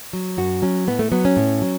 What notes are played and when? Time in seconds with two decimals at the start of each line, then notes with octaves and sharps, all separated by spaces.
0.13 F#3
0.37 F#2 F#4
0.62 F#3 C#4
0.87 A2 B3
0.99 A3
1.12 F#3 B3
1.25 C#4
1.37 A2
1.62 F#3